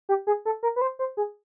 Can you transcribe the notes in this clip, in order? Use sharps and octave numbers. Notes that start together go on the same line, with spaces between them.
G4
G#4
A4
A#4
B4
C5
C5
G#4